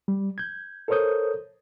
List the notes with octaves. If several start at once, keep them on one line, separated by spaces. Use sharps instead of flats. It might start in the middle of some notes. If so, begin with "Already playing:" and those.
G3
G6 G#6
A4 A#4 C5 C#5 D#6 G6